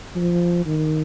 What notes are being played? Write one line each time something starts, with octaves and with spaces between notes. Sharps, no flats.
F3
D#3